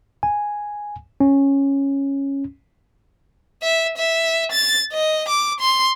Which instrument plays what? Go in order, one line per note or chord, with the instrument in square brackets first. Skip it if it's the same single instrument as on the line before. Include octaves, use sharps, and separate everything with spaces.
[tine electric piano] G#5
C#4
[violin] E5
E5
A6
D#5
D6
C6